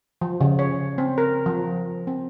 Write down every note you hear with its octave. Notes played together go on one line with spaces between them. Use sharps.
F3
C#3
C#5
C4
A#4
F3
C4